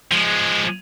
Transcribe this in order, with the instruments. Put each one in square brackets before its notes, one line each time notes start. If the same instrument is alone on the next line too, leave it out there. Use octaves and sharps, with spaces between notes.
[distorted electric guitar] F3 G#3